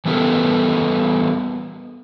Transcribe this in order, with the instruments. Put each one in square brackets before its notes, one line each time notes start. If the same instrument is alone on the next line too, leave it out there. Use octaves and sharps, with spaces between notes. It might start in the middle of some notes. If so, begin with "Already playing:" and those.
[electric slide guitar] E3 G3 B3 G4 A4 A#4